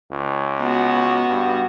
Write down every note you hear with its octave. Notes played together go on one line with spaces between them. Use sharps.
C#2
B3 F#4
G2